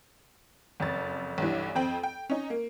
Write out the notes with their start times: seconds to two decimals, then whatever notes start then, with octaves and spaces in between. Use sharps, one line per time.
0.80 F#1 F2 A6
1.38 B1 G2 E3
1.75 F2 C4 G5 F#7
2.03 G5
2.30 C#4 D#4
2.50 A#3